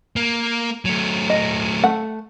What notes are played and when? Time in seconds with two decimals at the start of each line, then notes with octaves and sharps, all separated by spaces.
0.16 A#3
0.85 F#3 A3
1.30 D#5
1.83 A3 F#5